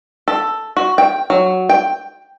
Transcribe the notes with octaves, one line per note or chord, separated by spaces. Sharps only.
A4
F#4
G5
F#3
G5